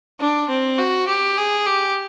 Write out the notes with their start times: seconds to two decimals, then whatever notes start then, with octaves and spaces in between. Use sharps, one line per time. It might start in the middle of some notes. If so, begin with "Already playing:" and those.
0.20 D4
0.49 C4
0.78 F#4
1.08 G4
1.37 G#4
1.66 G4